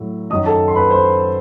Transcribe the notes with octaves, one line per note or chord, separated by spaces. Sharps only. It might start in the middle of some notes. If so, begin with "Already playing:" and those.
Already playing: A2 F#3
F#2 D#3 F#3 D#5 D#6
A4 A5
C6
B4 B5
C5 C6